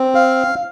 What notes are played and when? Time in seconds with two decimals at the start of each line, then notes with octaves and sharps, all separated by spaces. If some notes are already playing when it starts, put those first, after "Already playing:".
Already playing: C4
0.15 F5